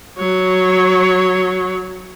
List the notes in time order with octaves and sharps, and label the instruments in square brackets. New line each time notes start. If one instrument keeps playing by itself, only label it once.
[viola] F#3 C#5